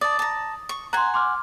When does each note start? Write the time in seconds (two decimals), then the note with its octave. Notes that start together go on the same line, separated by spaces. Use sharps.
0.01 D5 A5 D#6
0.19 A5 A#5
0.69 C#6
0.93 F#5 G#5 A#5 C6
1.14 C6 D6 F6